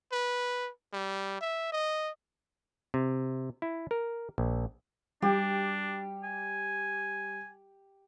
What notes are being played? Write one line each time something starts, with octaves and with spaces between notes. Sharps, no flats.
B4
G3
E5
D#5
C3
E4
A#4
A#1
G3 D4 G4
G#5